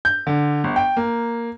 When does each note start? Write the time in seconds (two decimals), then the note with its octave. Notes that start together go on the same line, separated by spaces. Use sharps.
0.05 G6
0.27 D3
0.64 G1
0.76 G5
0.97 A#3